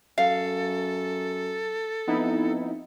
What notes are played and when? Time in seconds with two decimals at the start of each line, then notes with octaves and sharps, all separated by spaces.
0.18 F#2 A4 F5
2.08 F2 B3 D#4 E4